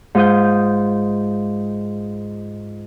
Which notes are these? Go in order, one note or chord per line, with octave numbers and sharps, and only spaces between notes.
G#2 F4 D#6 G6